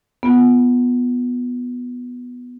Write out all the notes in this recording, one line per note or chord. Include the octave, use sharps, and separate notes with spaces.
B3 F4